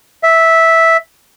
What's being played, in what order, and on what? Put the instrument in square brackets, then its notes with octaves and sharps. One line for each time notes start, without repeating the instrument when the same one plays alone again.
[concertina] E5